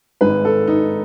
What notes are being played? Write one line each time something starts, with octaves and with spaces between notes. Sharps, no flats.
G#1 G#2 D#3 B4
A4
D#4